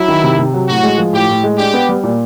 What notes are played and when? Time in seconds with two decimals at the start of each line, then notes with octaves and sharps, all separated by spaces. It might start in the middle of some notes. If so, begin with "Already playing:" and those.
Already playing: F#3 E4
0.08 D#3
0.24 C3
0.39 C3
0.54 F#3
0.68 A2 F#4
0.83 G#3
0.98 F3
1.13 A2 G4
1.29 A2
1.44 G#3
1.58 D4 G4
1.74 B3
1.89 G3
2.04 A#2